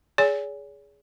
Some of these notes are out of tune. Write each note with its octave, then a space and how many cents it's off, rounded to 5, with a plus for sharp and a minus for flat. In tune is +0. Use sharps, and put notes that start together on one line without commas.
G#4 +0 C#5 +45 G#5 +0